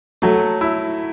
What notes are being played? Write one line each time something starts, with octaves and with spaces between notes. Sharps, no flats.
F#3 A3
E4